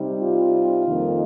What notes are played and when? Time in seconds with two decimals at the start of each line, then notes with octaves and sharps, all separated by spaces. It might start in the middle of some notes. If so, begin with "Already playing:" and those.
Already playing: C3 G3 D#4
0.18 F4
0.86 F2 D#3 A#3 D#4